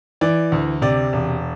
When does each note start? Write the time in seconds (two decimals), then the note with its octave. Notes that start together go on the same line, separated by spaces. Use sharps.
0.21 E3 D5
0.52 D2
0.82 C3 D5
1.13 E1